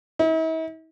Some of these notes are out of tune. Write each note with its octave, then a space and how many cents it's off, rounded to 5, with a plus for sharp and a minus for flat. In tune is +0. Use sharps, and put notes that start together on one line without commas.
E4 -45